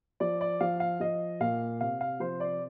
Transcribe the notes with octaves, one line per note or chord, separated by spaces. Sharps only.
F3 D5
D5
F3 F5
F5
F3 D#5
A#2 F5
C3 F5
F5
F3 C5
D5